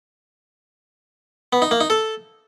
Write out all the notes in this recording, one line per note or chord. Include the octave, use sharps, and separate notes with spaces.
B3
D#4
A#3
D#4
A4